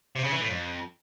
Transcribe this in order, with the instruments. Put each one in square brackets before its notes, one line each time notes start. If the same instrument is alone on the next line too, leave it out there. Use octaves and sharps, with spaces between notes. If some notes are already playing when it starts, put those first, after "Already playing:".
[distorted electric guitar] C3
C#3
E3
A2
F2